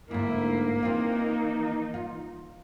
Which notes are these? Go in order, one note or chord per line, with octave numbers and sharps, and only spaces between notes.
D2 G#2 A#3 E4
E3 C4 D#4 F4
F4